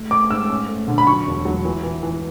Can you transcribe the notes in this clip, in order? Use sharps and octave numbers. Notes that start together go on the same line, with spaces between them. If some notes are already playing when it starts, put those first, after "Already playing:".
Already playing: A3
A3 D6
G#2 E6
C#4
A3
D3
B5
F#3 C#6
E1
F#3
E3
E3
E3